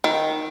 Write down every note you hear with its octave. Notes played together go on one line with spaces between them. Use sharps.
D#3